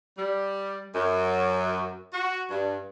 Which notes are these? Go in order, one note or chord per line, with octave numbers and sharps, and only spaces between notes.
G3
F#2
F#4
G2